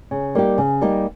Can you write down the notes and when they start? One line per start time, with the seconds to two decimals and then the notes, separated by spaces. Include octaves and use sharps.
0.11 C#3
0.35 G3 A#3 D#4 G4
0.58 C#3
0.81 G3 A#3 D#4 G4